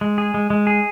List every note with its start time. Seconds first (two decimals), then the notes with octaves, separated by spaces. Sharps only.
0.01 G#3
0.18 G#4
0.34 G#3
0.50 G#3
0.67 G#4